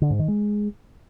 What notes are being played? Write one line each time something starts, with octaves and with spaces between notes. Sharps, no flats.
D3
G#2
D#3
G#3